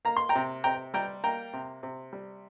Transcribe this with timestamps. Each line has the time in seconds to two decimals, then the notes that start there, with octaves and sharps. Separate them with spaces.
0.05 A#3 A#5
0.17 C6
0.29 G5 A#5
0.35 C3
0.64 C3 G5 A#5
0.94 G3 G5 A#5
1.24 A#3 G5 A#5
1.53 C3
1.83 C3
2.13 G3